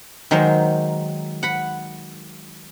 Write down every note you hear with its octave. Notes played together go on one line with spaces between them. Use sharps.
D#3 F#3 G#3 A#4 C5
F#5 B5